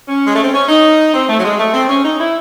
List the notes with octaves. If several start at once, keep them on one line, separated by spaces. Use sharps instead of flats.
C#4
G#3
A3
C4
C#4
D#4
C4
A3
F#3
G#3
A3
C4
C#4
D#4
E4